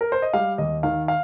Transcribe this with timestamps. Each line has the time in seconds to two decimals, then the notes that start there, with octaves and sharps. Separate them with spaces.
0.01 A#4
0.12 C5
0.22 D#5
0.33 G3 F5
0.58 D#2 D#5
0.83 D#3 F5
1.08 F5